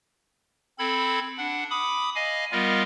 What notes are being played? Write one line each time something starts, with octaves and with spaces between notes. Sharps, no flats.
C4 A4 B5 G#6
D4 F#5
B5 D6 D#6
D#5 F5 G#5
G3 B3 F4 A#4 D#5 F5